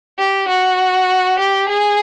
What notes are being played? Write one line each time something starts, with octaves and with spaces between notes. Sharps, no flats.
G4
F#4
G4
G#4